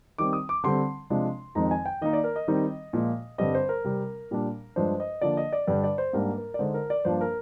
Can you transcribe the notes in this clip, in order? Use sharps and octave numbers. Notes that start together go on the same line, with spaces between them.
D#3 G3 C4 D6
D#6
D6
D3 G3 C4 C6
C3 F3 G#3 D4
F2 D#3 G#3 C4 D#4 A#5
G#5
G5
D#3 A#3 D#4 D#5
D5
A#4
D#5
D#3 G3 C4 D#4
A#2 F3 G#3
G2 D3 G3 C4 D#5
C5
A#4
C3 G3 C4
A#2 G3 D4
G2 F3 G#3 D4 C5
D#5
D3 F3 A#3 D4 D5
D#5
D5
G2 D3 G3 D4 D5
D5
C5
G#2 G3 A#3 D4 A#4
A#4
D5
D3 G#3 D#4 C5
A#4
D5
G2 F3 A#3 D4 C5
A#4